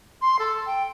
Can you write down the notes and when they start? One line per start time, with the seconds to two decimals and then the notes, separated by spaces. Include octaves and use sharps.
0.21 C6
0.39 A4
0.66 G5